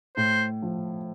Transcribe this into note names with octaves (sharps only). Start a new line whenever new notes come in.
A2 C5
F3